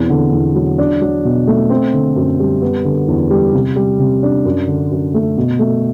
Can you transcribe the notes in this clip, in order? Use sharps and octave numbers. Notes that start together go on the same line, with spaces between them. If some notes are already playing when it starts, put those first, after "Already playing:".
Already playing: E2 B2 C4
D3
E2
F#3
D4
F#3
B2
A3
C4
D3
F#2
G3
B3
D3
E2
G3
C3
G3
C3
D4
F#2
D3
F#2
A3
B2
A3